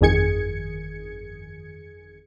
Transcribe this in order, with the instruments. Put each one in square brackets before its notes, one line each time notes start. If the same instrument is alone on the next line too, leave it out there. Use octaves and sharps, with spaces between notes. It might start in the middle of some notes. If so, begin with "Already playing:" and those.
[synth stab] G1 F2 D#3 G#4 G#6 C#7